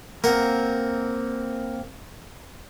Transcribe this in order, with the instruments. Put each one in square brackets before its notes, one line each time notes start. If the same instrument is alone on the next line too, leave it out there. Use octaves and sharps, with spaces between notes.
[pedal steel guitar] A#3 C4 [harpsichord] A#4 F#5